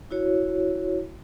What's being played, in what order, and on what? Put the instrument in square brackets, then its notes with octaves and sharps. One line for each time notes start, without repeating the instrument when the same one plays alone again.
[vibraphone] E4 F#4 C#5